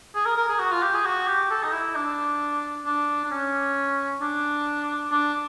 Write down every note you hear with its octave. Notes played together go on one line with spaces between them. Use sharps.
G#4
A#4
A#4
G#4
F#4
F4
G4
G#4
F#4
G4
A4
D#4
E4
D4
D4
D4
C#4
D4
D4